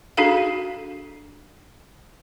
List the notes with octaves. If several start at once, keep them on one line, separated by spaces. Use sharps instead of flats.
D4 D#4 F#4 G#4 A4 F5